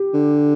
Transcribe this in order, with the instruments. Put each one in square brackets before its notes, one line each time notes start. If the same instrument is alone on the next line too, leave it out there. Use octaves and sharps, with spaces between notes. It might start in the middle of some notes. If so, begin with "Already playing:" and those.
Already playing: [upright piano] G4
[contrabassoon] D3